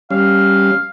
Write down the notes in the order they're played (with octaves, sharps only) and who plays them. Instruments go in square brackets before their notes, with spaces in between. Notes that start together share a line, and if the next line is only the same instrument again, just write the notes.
[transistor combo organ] G3 C#4 [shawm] F5